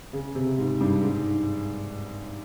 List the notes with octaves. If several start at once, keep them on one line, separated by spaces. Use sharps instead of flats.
C#3
C3
G#2
G2
G#2